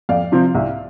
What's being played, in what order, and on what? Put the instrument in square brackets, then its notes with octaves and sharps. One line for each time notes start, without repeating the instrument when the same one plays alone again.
[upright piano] F2 D5 F5
C3 F3 C4
C2